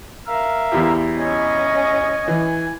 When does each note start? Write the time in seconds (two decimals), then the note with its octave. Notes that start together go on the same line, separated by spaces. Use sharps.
0.27 A#4 E5 F5
0.72 E2 E4 G4
1.18 C#4 D#5 G#5
2.28 E3